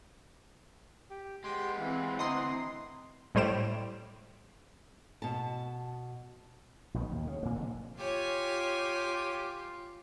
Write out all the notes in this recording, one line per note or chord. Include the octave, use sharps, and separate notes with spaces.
G4
G#3 B3 G4 G5 C6
E3 C4 F5
D2 D#5 F#5 A#5 C6
A2 G3 C5 D7 E7
B2 A5
A#1 B2 D#3
D#2
C#3
A#2 A#3
F1 D3
F4 G4 C#5 G#5